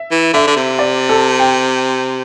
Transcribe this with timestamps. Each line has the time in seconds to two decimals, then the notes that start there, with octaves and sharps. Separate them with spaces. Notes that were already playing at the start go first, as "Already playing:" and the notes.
Already playing: E5
0.11 E3
0.33 D3 E5
0.47 D3
0.56 C3
0.79 D5
1.09 A4
1.40 G5